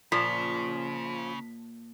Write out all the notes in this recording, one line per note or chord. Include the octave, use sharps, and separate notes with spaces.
A#2 C#3 F3 B6